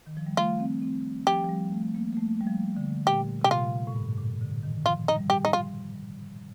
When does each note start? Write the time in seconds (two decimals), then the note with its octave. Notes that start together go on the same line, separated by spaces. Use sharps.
0.06 D#3
0.17 F3
0.26 G3
0.37 A3 F4
0.60 C4
0.82 C4
1.27 F3 G4
1.44 F3
1.49 G3
1.72 A3
1.95 A#3
2.13 A#3
2.17 A3
2.41 G3
2.47 F3
2.77 D3
3.06 A#2 G4
3.42 C3 G4
3.51 A#2 F4
3.87 A2
3.96 G2
4.18 A#2
4.41 D3
4.63 D#3
4.85 F3 F4
5.08 D#4
5.16 G3
5.30 G4
5.45 D#4
5.53 F4